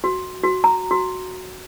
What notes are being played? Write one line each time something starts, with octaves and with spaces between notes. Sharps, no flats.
F#4
F#4
A#5
F#4